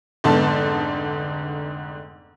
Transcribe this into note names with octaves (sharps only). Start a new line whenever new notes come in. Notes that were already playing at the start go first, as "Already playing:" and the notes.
F1 G#2 D3 B3 A5